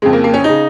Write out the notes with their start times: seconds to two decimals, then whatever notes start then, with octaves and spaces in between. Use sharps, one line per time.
0.02 F2 C#3 G#3
0.13 A#3
0.24 A#3
0.34 C#4
0.44 C#3 D#4